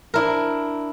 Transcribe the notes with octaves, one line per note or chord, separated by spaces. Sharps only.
D4 E4 A#4